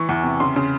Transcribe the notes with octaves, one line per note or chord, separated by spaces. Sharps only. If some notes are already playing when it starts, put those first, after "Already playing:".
Already playing: E3 C#6
E2
C3
C#3 C6
C#3